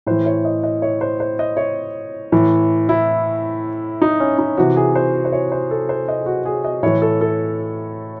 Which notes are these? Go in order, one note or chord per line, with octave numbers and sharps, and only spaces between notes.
A2 E3 C5
C#5
D#5
D#5
C#5
C5
C5
D#5
C#5
A2 E3
E4
D#4
C#4
D#4
C3 E3 F#4
G#4
C5
C5
C#5
C5
A4
C5
D#5
G#4
F#4
G#4
D#5
A2 E3 C#5
A4
A4